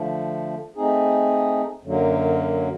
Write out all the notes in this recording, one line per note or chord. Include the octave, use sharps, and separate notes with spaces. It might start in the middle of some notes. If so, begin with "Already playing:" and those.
Already playing: D3 F3 A3
A3 C4 D#4 G#4
F#2 D3 F#3 A#3